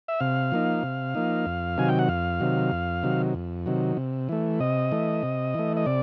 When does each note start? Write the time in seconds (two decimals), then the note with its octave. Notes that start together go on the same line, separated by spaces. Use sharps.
0.08 E5
0.20 C3 F5
0.52 F3 A#3 D#4
0.83 C3
1.15 F3 A#3 D#4
1.46 F2
1.78 C3 D#3 F#3 G#5
1.89 G5
1.99 F#5
2.09 F2 F5
2.40 C3 D#3 F#3
2.72 F2
3.03 C3 D#3 F#3
3.35 F2
3.66 C3 D#3 F#3
3.97 C3
4.29 E3 A3
4.60 C3 D#5
4.91 E3 A3
5.23 C3
5.54 E3 A3
5.77 D#5
5.86 C3 D5